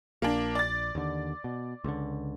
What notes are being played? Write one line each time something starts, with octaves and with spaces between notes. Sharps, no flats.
A#1 A#3 D4
D5 A6
D#2 D3
B2
C#2 D3